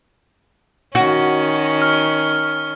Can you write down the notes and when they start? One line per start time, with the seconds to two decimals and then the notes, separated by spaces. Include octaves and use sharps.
0.95 D#3 C#4 F#4
1.82 F6